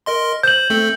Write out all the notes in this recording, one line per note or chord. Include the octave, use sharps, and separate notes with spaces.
A#4 D#5 C6
C5 G6 F#7
A3 C4 A4